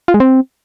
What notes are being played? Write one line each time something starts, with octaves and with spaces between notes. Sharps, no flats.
F4
G#3
C4